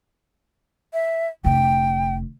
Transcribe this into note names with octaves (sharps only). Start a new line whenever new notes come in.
E5
F1 D3 G5